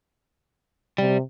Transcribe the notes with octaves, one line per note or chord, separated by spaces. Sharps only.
C3 G3